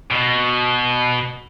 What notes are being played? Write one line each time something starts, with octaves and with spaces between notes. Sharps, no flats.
B2